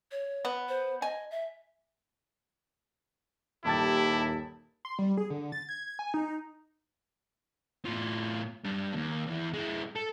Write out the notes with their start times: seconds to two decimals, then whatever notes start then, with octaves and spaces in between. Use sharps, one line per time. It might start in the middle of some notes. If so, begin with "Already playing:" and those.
0.11 C#5
0.45 B3
0.69 C5
1.02 D#5 G#5
1.31 E5
3.65 D#1 D#2 E4 G4 A5 A6
4.85 C6
4.99 G3
5.17 G#4
5.30 D3
5.52 A6
5.69 G#6
5.99 G#5
6.14 D#4
7.85 A2 F4
8.65 G2 D4
8.94 D#2
9.27 E2 E3
9.54 G#3 E4
9.95 A4